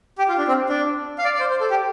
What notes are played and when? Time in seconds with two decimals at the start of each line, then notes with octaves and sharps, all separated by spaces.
0.18 G4
0.29 F4
0.38 D4
0.48 C4
0.69 D4
1.18 F5
1.25 D5
1.35 D5
1.40 C5
1.50 C5
1.61 A4
1.70 G4